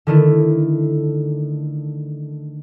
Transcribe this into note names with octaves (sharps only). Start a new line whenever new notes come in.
D3 D#3 A3 E4